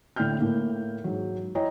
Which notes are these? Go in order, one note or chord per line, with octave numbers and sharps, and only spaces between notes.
A2 D3 G5 F6 G6
A2 A#3
G#2 F#3
E4 C#5 D#5 G5 A#5